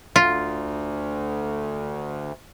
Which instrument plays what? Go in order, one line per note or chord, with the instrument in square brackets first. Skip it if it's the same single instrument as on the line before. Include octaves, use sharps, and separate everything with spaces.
[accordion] D2 [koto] F4